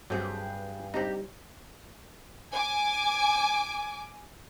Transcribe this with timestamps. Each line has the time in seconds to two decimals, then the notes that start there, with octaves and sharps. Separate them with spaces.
0.10 G2 F#3 A3 C4 G4 G#4 B4
0.94 G3 C4 D4 D#4 G4 A#5
2.52 G#5 D6